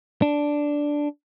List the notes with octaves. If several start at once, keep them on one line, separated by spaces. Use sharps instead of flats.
D4